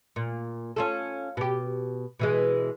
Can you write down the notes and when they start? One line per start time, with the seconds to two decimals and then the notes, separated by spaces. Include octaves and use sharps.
0.16 A#2
0.76 C#4 F4 A4
1.37 B2 G4
2.19 B2 E3 G#3